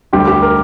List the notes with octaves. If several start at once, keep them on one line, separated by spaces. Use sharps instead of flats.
D2 D3 G3 G4
G4
A#4